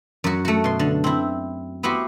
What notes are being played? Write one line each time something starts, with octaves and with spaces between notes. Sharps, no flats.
F#2 F#4
A3 F#4
B2 C6
D3
C4 E4
B3 E4 F#4 G4 C5